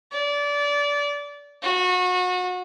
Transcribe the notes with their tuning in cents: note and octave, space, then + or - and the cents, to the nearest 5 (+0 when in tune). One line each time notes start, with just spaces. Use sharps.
D5 -25
F#4 -30